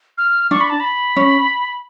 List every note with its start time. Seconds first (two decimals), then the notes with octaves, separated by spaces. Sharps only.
0.18 F6
0.51 D4 C#6
0.61 B5
0.70 A5
0.80 B5
1.16 C#4